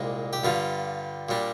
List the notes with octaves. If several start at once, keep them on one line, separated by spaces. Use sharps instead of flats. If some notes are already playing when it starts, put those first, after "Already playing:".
Already playing: C2 A#2 G#3 D4
G4
G2 D3 G3 F4
A#2 G3 D4